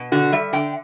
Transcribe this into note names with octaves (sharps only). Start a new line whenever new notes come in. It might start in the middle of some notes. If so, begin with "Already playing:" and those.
Already playing: B2
D3 F#4
G3 E5
D3 G5